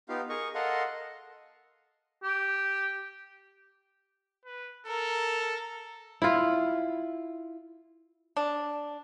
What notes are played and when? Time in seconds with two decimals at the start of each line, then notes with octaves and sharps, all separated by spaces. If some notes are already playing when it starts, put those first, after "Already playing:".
0.09 B3 D#4 F4 G4 F5
0.29 G#4 A#4 D#5 C#6
0.55 A4 A#4 D#5 F5 F#5 C6
2.23 G4
4.45 B4
4.87 A4 A#4
6.22 E4 F4
8.37 D4